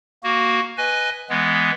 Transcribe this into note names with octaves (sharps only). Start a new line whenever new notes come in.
A#3 F#4
B4 D#5 G#5
E3 G#3 B3